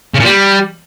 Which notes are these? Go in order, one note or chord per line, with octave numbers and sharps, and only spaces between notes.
C#3
A#2
G3